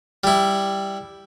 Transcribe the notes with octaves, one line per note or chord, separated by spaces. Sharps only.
G3 E4